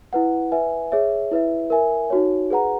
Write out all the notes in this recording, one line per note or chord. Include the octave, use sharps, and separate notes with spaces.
E4 B4 F#5
B4 E5 G#5
G#4 C#5 E5
E4 B4 E5
A#4 E5 G#5
D#4 F#4 C#5
G#4 B4 F#5 A#5